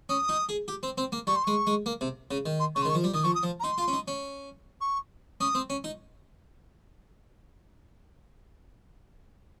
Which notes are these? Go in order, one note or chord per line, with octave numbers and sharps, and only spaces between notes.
C#4 D#6
D#4
G#4
G4
C4
C4
A#3
G3 C#6
C6
G#3 C#6
G#3
A#3
C3
C#3
D#3
C6
C#3 C#6
C6
D#3 C#6
F3
G3
D#3 D#6
F3 C#6
D#6
F3
A#5
D#4 C6
F4
C#4
D#4
C#4
C#6
C#4 D#6
C4
C#4
D#4